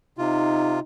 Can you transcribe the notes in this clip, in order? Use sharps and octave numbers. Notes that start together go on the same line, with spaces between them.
C3 D#4 F4